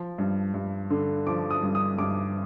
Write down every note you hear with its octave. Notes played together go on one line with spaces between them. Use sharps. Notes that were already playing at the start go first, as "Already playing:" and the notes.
Already playing: F3
G2
G2
D3
F3 D6
D#6
G2
D#6
G2 D6